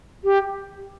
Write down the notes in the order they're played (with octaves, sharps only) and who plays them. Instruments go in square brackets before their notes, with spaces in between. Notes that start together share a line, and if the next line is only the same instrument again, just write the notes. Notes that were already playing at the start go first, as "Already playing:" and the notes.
[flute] G4